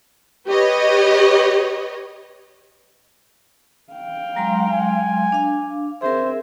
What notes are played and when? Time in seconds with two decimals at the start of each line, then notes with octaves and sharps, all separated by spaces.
0.48 G4 B4 C#5 D#5
3.93 F5 G5
4.36 F#3 G#3 A#5 C6
4.73 G#5
5.32 D4 F5 D6
6.02 C4 G#4 A#4 C5 E5